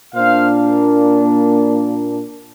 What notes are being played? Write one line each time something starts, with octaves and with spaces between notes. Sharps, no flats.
A#2 A#3 D4 C5 F5